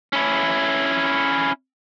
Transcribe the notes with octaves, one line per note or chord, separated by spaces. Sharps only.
C#4 E4